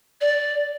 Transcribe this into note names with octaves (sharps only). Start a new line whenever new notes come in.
D5